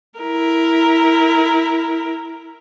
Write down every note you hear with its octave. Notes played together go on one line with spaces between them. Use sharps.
E4 A#4